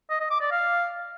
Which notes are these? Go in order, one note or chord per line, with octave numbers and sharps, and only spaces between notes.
D#5
D#5
D6
D5
F5